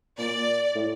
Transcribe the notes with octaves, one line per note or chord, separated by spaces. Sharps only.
A#2 D5
A2